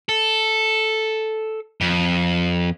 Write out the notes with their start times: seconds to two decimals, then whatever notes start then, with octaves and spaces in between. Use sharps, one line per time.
0.09 A4
1.81 F2